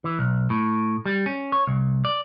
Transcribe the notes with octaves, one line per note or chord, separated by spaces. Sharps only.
E3
B1
A2
G3
C#4
C#5
C2
D5